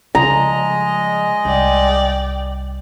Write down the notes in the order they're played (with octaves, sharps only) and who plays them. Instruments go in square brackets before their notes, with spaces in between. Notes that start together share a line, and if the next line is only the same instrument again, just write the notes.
[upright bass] C#3 F3 [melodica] G#3 D#5 [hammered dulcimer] A#5
[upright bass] C2 [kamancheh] D5 G5